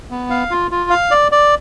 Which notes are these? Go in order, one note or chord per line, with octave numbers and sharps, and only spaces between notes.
B3
F5
F4
F4
F5
D5
D5